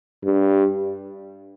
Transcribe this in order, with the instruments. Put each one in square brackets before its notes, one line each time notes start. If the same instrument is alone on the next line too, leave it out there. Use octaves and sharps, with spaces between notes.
[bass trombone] G2